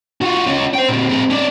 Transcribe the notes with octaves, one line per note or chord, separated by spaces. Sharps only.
F4 F#4
C#4 F4
C5 G5
A#2 C4
C4 G#4
C#4 D5